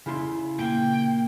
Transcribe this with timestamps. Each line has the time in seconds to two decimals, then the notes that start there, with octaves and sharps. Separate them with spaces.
0.06 C#3 E4 C6
0.59 A#2 A#3 G5